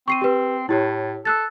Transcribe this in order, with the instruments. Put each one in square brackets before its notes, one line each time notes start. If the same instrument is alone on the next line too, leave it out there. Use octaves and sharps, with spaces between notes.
[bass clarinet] C4 [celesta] C#6 C7 D#7
[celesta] G4 B4
[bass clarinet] A2 [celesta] E4 G4 C#5
[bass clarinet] A4 [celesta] E6 F#6 A6